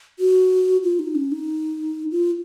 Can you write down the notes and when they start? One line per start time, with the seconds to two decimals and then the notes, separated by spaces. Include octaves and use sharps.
0.19 F#4
0.83 F4
0.99 D#4
1.15 C#4
1.32 D#4
2.11 F4